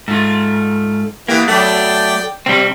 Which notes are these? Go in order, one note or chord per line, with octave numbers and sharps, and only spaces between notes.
G#2 A3 F4
E3 A#3 B3 G4
F#3 A3 B3 A4 D5 G5
B2 G3 C4